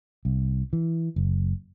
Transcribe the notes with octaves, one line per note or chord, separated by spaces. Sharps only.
C2
E3
F#1